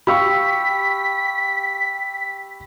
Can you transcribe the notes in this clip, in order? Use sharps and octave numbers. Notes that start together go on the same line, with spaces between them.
G4 F5 G5 B5 C#6 E6 B6